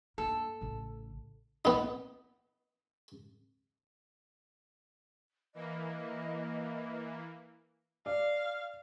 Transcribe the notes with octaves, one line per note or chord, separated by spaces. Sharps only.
G2 A#3 A4
A1 C#3
B3 D#4
E3 A#3 D#5
D5 F5